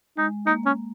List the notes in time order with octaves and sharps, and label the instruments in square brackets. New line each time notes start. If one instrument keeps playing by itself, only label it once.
[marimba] G#3 [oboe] D#4
[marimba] A#3 [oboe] D#4
[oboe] C#4